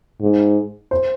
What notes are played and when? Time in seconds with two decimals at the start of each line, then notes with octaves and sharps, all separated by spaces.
0.22 G#2
0.91 C5